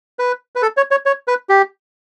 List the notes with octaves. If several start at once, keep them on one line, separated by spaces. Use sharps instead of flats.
B4
B4
A4
C#5
C#5
C#5
B4
G4